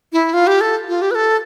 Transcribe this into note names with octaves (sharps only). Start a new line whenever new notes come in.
E4
F4
G4
A4
F4
G4
B4
A4